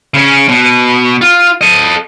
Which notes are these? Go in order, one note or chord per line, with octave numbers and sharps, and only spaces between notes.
C#3 C#4
B2
F4
A4 D#5